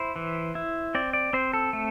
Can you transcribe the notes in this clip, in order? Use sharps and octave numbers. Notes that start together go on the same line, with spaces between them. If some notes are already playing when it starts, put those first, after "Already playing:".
Already playing: E4 C5
E3
E4
C4 D5
D5
C4 C5
A4
A3